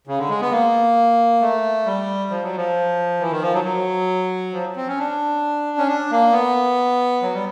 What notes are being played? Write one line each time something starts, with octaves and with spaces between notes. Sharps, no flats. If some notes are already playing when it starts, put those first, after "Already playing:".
C#3
D3
G#3
B3
A#3
A3
G3
F3
F#3
F3
E3
D#3
F3
F#3
F#3
F3
C4
C#4
D4
C#4
D4
A#3
B3
F#3
G3